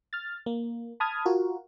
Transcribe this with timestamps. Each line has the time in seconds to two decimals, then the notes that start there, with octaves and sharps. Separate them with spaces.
0.13 F6 A6
0.46 A#3
1.00 A5 B5 D#6 F6 G#6
1.26 F4 F#4 A#4